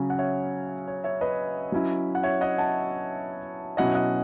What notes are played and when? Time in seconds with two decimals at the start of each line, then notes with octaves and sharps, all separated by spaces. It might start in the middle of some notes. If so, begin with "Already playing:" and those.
Already playing: C#3 F#3 C#4
0.10 F#5
0.19 C#5 E5
0.88 C#5
1.04 C#5 E5
1.21 B4 D#5
1.72 F#3 C#4 E4
2.15 F#5
2.23 C#5 E5
2.41 D#5 F#5
2.58 F#5 A5
3.77 B2 F#3 C#4 E4 D#5 F#5
3.95 D#5 F#5